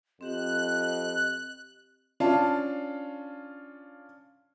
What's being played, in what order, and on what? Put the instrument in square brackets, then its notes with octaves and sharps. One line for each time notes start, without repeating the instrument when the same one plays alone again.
[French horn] F2 [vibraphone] C4 G4 [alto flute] D#5 [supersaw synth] F#6
[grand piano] C#4 D4 F4 F5 A5